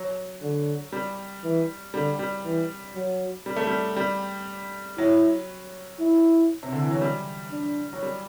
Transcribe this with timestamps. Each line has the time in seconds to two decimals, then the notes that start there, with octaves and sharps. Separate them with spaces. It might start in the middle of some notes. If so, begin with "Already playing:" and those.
Already playing: F#3
0.42 D3
0.92 G3
1.44 E3
1.94 D3 G3
2.19 G3
2.44 E3
2.95 F#3
3.46 G3
3.56 A3
3.67 G3
3.96 G3
4.98 F#3 E4
6.00 E4
6.63 C3
6.72 D3
6.82 E3
6.91 F#3
7.01 G3
7.51 D4
7.93 F#3
8.03 G3